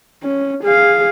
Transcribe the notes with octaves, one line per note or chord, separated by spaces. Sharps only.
C#4
G#4 F5